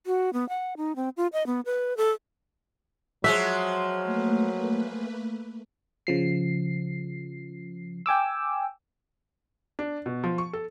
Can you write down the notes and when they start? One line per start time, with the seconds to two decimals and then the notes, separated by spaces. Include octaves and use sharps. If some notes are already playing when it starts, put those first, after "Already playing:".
0.06 F#4
0.33 B3
0.49 F#5
0.77 D#4
0.96 C4
1.17 F4
1.33 D#5
1.46 B3
1.66 B4
1.97 A4
3.24 F3 F#3 G#3 F#4 E5
4.03 A3 A#3 B4
6.07 C#3 F3 C7
8.06 G5 G#5 D6 E6
9.79 D4
10.06 B2
10.24 F3
10.38 C#6
10.53 A4